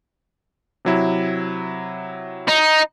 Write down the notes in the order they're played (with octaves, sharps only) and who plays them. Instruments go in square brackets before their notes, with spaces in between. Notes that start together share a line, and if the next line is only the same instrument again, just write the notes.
[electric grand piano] C3 F#3 E4
[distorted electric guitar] D#4